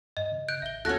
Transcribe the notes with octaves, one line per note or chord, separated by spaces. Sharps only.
G2 D#5
C#3
F#6 G6 D7
A1 E5 G7
D#2 C#4 F#4 A4 F#6 A#6